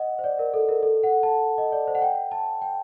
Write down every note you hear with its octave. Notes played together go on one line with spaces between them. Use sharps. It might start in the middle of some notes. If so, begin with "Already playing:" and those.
Already playing: D#5 F#5
C5
D5
A#4
A4
A#4
A4
F#5
A5
D#5
D5
C5
F#5
G5
A5
G5